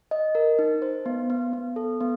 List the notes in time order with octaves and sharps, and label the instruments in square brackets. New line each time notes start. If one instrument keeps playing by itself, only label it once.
[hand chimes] D#5
A#4
D#4
C5
B3
B3
B3
A4
B3